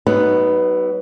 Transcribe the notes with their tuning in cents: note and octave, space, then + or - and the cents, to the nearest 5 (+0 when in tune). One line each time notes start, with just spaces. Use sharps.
F#3 +40 B3 +0 D#4 +0